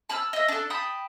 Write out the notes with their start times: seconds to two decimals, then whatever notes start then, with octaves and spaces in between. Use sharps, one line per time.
0.09 A5 B5 E6 F6
0.33 D#5 E5
0.48 D4 A4
0.70 G5 A5 B5 D#6